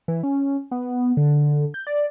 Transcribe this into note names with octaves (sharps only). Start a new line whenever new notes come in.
E3
C#4
B3
D3
G6
D5